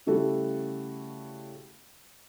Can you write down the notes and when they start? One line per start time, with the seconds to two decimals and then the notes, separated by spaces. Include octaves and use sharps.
0.07 C#3 G3 A3 E4 F#4 A4